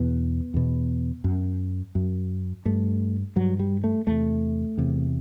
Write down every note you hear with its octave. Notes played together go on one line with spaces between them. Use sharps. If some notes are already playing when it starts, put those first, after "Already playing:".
Already playing: E2 B2 B3
E2 B2
F#2
F#2
G2 A3
G2 F#3
G3
A3
E2 C3 A3
E2 C3